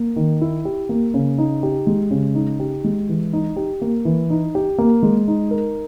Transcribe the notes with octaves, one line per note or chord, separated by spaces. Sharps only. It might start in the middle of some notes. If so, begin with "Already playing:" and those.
Already playing: A#3
D#3
E4
G4
A#3
C#3
D#4
G4
G#3
C#3
D#4
G4
G#3
E3
D#4
G4
A#3
E3
D#4
G4
A#3
G#3
D#4
A#4